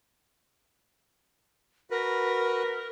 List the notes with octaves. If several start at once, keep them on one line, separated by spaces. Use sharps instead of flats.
F#4 A#4 B4